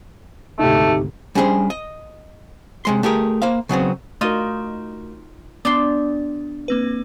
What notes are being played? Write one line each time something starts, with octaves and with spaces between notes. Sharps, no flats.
G#1 D2 C3 A3 D#4 G4
G3 C#4 D4 G#4 A#4 C5
D#5
C3 G#3 C6
A3 G4 G#4 A#4
A#3 C5 F5
C#3 F#3 B3 C4
A3 D#4 F4 F#4 A#4 D#5
B3 D4 G4 C6
A#3 C4 B4